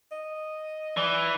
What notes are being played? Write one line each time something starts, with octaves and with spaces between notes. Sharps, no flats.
D#5
E3 D5